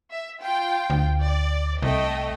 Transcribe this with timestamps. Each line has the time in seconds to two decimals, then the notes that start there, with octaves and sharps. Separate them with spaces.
0.11 E5
0.41 F4 G5
0.90 D2
1.25 D5
1.82 C2 A3 D#5 G5